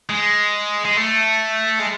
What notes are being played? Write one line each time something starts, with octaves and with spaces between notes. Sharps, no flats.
G#3
G#3
A3
G#3